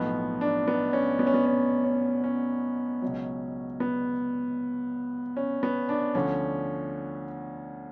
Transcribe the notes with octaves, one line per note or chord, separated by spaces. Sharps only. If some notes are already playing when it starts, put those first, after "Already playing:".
Already playing: B1 A2 F3 B3
D4
B3
C#4
B3
C#4
B3
C#4
C#4
C#4
C#2 B2 F#3
B3
C#4
B3
D4
D2 D3 F3 C#4